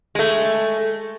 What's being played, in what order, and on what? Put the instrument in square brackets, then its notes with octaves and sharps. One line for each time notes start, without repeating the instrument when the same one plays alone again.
[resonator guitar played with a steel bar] G#3 A3